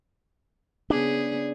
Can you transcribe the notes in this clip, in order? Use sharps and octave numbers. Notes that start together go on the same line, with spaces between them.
C#3 B3 D4 G#4